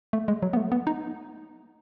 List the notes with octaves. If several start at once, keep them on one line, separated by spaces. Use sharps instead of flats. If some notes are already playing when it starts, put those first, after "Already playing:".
A3
G#3
F#3
B3
A3
B3
D#4